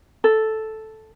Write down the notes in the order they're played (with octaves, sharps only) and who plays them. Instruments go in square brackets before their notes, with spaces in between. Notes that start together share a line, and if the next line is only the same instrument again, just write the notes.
[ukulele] A4